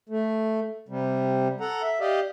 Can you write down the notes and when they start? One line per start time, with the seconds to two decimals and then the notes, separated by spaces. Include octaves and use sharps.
0.09 A3
0.89 C3 G3
1.60 A4 F#5 A#5
1.83 E5
2.01 G4 D5 D#5 F5